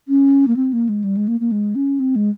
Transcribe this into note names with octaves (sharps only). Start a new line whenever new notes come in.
C#4
A#3
C4
A#3
G#3
G3
G#3
A#3
A#3
G#3
C#4
C4
G#3